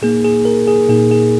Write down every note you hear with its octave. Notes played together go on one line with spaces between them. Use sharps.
A#2 A#3 D#4 G#4
G#4
A#4
G#4
A#2 A#3 D#4 G#4
G#4